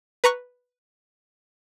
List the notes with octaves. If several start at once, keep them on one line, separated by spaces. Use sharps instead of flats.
B4 A#5 C#6 F#6